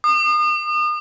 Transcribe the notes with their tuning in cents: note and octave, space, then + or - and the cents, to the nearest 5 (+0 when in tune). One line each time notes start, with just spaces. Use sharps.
D#6 -40